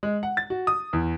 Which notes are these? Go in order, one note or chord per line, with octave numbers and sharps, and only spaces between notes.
G#3
F#5
A6
F#4
D#6
E2